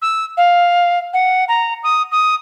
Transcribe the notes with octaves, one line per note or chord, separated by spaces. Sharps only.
E6
F5
F#5
A#5
D#6
D#6